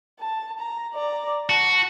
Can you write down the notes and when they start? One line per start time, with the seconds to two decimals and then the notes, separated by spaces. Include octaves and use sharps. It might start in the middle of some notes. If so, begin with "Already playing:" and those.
0.20 A5
0.59 A#5
0.94 D5 A#5
1.49 F#4 A5